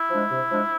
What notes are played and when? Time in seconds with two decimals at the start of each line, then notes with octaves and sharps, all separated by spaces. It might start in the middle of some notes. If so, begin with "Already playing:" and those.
Already playing: E4
0.10 F3 G#3 D4
0.30 C3
0.51 F3 G#3 D4